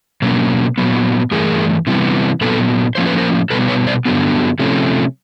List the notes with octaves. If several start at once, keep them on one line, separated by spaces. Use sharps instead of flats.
B2 F#3 A#3 C#4
A#2 F#3 B3
G2 E3 A3 G#4 A#4
C3 E3 G3 B3
A#2 F#3 B3 A4 B4
A2 F3 A#3 C#4 C5
B4
A#4 C5
B2 G3 B3 A4 B4
B4 C#5
C5 D5
G2 D3 F#3 B3
C3 F3 A3 C#4